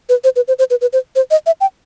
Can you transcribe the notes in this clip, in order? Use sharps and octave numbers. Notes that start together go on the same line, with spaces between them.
B4
C5
B4
C5
C5
B4
B4
C5
C5
D#5
E5
G5